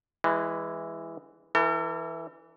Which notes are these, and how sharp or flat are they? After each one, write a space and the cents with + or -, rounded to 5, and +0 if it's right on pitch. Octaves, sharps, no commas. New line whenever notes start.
E3 +0 G#3 -20
E3 +0 A4 +45